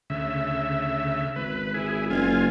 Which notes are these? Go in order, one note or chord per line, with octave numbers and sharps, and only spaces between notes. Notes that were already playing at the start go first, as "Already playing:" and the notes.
D2 C#3 E5
G#1 B4
E4 G#4
F#1 F4 G#5